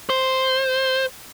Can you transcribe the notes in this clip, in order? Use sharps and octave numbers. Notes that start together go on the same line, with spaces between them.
C5